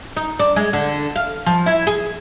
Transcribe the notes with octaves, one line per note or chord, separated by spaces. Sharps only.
D#4
D4
G#3
D3
F5
F3
E4
G#4